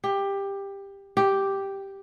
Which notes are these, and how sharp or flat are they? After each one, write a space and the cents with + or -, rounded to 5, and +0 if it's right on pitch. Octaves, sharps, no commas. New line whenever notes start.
G4 +15
G4 +0